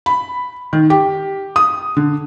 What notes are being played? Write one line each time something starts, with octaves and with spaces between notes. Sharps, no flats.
B5
D#3
G4
D#6
D3